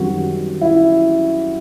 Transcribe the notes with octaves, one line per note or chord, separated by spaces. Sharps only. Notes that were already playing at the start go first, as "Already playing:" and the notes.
Already playing: F#2 D#3 G3 C4 F#4
E4